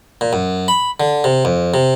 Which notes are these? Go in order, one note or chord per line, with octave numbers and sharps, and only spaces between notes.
A#2
F#2
B5
D3
C3
F2
C3